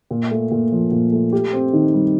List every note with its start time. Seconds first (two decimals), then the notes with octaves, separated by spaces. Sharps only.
0.11 A#2
0.31 A3
0.51 A#2
0.72 F3
0.92 A#2
1.12 A3
1.32 G4
1.53 C4
1.73 D#3
1.94 G3